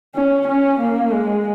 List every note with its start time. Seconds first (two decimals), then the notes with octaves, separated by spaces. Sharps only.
0.15 C#4
0.47 C#4
0.80 A#3
1.13 G#3